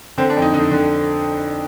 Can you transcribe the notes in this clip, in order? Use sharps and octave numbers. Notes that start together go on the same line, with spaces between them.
D3 C4
D4
F2
D#4
D3 D#4
D3